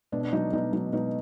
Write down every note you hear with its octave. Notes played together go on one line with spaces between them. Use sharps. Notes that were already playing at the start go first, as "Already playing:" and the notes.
B2 D4
D4
F#3 D#4
B2 D#4
F#3 D#4
B2 D#4